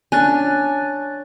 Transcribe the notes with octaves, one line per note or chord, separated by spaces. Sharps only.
C#4 D4 C#5 G#5 F#6 A6